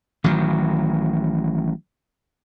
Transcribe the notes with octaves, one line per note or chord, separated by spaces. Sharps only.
A1 D#3 F#3